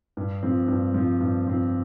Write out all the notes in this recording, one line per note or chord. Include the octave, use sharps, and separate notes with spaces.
G2
F3 C4
G2
F3 C4
G2
F3 C4